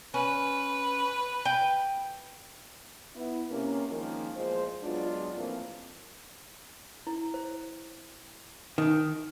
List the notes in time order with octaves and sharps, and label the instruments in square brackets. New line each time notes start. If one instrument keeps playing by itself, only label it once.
[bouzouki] C#4 [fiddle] B4
[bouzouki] G5
[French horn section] B3 E4
C3 A#3 C#4
D#3 F3 G#3 A#3 C#4 A#4
E2 A#2 F3 G#3 C5
F#3 G#3 B3 D4 F4
A2 E3 F3 A#3 C4
[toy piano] E4
C5
[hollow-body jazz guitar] D#3 [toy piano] D#4 D#6